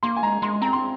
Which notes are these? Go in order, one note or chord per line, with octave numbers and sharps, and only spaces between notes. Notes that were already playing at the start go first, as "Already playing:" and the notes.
A#3 C6
G#5
G#3 A#5
G#3 C6
C4 A#5
C6